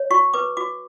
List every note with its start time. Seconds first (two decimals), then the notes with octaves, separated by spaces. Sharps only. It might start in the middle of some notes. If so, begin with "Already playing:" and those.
Already playing: C#5
0.10 F#4 C#6
0.34 B4 D6
0.57 F#4 D6